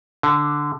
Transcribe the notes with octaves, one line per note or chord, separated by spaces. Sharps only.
D3